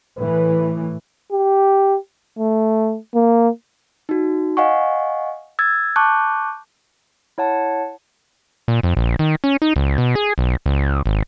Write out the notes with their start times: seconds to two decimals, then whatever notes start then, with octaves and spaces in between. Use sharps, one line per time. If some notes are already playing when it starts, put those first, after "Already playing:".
0.17 A2 E3 B4
1.32 G4
2.39 A3
3.15 A#3
4.09 D#4 F#4
4.57 D#5 F5 F#5 G#5 C#6
5.59 E6 G#6 A6
5.96 A5 C#6 D6 F#6 G6
7.38 E4 C#5 F#5 A5
8.68 A#2
8.83 F2
8.97 A#1
9.19 D#3
9.44 C#4
9.62 D#4
9.76 C#2
9.98 B2
10.15 G#4
10.38 B1
10.66 C#2
11.06 G#1